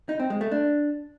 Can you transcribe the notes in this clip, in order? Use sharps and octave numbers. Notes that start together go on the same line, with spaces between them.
D#4
C4
G#3
A3
D4